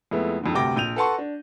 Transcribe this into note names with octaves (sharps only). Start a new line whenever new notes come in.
F2 G#3 A3 B3 E4
F2 G#2 D3
D2 G2 C3 G5 D6 A#6
A#1 G6 D#7 F7
A4 B4 F#5 A5 C6 C#6
D4